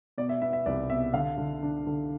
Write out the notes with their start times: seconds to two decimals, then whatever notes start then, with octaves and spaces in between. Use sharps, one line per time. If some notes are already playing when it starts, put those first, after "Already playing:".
0.18 B2 D5
0.29 E5
0.42 B3 E5
0.53 E5
0.66 C2 D5
0.90 B2 E5
1.13 D3 F5
1.38 D3
1.63 D4
1.87 D3